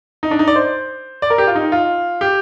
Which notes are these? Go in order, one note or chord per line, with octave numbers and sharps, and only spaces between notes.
D#4
D4
D#4
D5
C5
D5
A#4
G4
F4
D#4
F4
G4